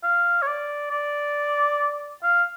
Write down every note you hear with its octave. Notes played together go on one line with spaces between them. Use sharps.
F5
C#5
D5
D5
F5